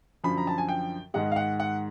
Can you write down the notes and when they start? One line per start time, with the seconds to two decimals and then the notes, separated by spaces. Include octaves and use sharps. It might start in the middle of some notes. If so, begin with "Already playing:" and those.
0.24 F#2 D3 F3 B5
0.37 A#5
0.47 A5
0.58 G#5
0.69 G5
1.14 G#2 D#3 G#3 F#5
1.32 F5
1.36 F#5
1.60 F#5